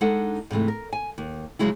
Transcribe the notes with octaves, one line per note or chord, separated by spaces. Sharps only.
G#3 D4 D#4 A4 F#5
G#2 C3 E3 A3
A#4
G#5
D#2
C#3 F3 F#3 G#3 E4